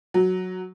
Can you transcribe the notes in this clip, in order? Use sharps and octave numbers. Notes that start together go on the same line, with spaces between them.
F#3